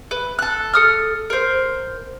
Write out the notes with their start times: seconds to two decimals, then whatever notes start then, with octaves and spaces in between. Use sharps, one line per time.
0.11 B4
0.39 A4 F#6
0.74 A4 D#6 F6
1.30 A#4 C5